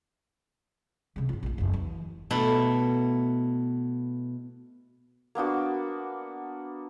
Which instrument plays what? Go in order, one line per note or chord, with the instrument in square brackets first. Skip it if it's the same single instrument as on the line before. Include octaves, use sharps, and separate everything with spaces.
[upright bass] C#2 C3
G#2 F4
A#1 A3
F#1 E2
E3
[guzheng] B2 A3 E4
[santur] A#3 B3 D4 F#4